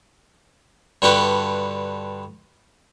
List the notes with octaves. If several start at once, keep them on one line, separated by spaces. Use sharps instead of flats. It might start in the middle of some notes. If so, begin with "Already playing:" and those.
G2 D3 F#4 G4 B4